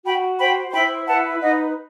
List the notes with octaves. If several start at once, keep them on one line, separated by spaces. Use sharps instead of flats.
F#4 G5 B5
C5 G5 B5
C6
E4 G5 B5
B4 F#5 A5
D#4 D#5 F#5